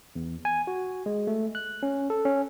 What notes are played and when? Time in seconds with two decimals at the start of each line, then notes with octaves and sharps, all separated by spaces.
0.15 E2
0.45 G#5
0.67 F#4
1.06 G#3
1.27 A3
1.55 F#6
1.83 C#4
2.10 A4
2.25 C#4